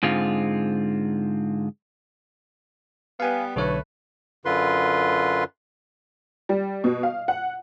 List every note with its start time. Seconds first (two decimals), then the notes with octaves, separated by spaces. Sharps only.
0.03 G#2 D3 G#3 C4 F4
3.20 G3 B3 F5 G#5
3.56 B1 D3 A3 B4 C#5
4.45 F#2 D3 F4 B4 C6
6.49 G3
6.84 B2
7.03 F5
7.28 F#5